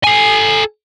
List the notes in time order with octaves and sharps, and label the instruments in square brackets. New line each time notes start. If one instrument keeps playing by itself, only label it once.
[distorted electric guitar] A4 G#5